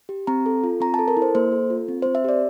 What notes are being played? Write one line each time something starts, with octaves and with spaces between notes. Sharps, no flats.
G4
C4 A#5
A4
F4
C4 A#5
A5
A4
A#4
E4
C5
A#3 C5
A4
F4
C4
C4 C5
E5
G4 D5